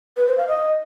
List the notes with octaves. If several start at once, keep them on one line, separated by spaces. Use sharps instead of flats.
B4
C5
F5
D#5